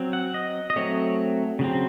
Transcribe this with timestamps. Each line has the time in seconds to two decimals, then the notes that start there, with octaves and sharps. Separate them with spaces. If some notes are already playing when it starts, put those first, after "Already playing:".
Already playing: F#3 C4
0.13 F#5
0.34 D#5
0.70 D#5
0.76 F#3 A3 C4 C#5
1.59 C#3 F#3 C4